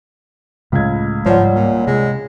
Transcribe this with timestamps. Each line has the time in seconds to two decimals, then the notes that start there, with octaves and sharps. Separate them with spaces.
0.72 C#2 A2 F5 G#6
1.26 G#2 F3 G3 C#5 D5 F#5
1.55 A#2
1.87 C3 G#3